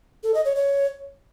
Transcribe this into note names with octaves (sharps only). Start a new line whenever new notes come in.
A4
D#5
C#5
C#5